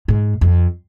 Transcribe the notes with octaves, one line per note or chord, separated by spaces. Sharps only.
G#2
F2